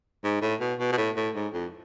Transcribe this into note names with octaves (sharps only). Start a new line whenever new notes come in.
G#2
A2
B2
B2
B2
A2
A2
G#2
F2